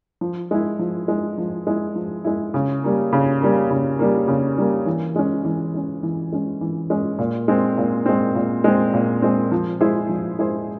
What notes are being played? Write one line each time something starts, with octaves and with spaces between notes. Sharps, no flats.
F3
G#3 E4
F3
G#3 E4
F3
G#3 E4
F3
G#3 E4
C#3
G3 A#3
C#3
G3 A#3
C#3
G3 A#3
C#3
G3 A#3
E3
G#3 C#4
E3
G#3 C#4
E3
G#3 C#4
E3
G#3 C#4
A#2
G#3 C4
A#2
G#3 C4
A#2
G#3 C4
A#2
G#3 C4
F3
G#3 E4 G#4 C5
F3
G#3 E4 G#4 C5